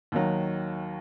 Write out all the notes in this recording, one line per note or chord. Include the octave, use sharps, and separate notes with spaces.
D#2 D#3 F#3